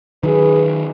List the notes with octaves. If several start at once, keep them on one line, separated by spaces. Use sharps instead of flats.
D#3 F#3 G#4 B4